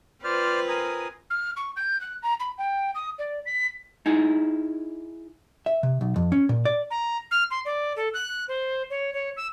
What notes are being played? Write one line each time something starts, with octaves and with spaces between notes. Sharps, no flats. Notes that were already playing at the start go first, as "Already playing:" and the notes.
C4 F4 B4 C5 D5 F6
A#4 G#5 D#6
F6
C#6
G6
F#6
A#5
B5
G5
D#6
D5
B6
D#4 E4 G#4
E5
C3
B1
F2
C#4
A#2
D5
A#5
F6
C6
D5
A4
F#6
C5
C#5
C#5
E6